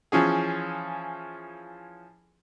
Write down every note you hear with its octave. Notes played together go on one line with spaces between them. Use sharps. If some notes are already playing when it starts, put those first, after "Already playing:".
E3 F3 C#4 G#4